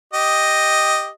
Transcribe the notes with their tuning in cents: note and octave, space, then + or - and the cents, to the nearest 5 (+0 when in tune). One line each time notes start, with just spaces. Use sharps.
G4 +0 D#5 +0